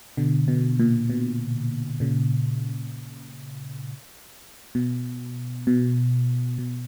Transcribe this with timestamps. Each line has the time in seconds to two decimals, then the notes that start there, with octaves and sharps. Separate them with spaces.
0.17 B2 D3
0.48 B2
0.80 A#2
1.10 B2
2.00 A#2 C#3
4.75 B2
5.67 B2
6.58 B2